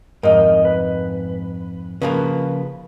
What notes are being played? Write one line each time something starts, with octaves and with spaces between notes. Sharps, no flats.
F2 G#2 A#4 D#5
B4
C#3 F3 A#3 B4